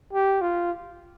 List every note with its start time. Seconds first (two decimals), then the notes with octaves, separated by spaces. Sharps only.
0.13 G4
0.42 F4